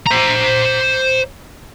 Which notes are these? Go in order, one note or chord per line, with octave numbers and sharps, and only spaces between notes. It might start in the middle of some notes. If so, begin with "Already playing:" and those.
C5 A#5